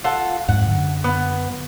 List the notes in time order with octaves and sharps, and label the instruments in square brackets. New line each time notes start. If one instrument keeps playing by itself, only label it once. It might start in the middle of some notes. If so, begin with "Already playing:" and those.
[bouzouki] F4 A4 F#5
[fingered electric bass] F2 G#2 [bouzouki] F#5
[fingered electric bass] F#2 D3
[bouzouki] B3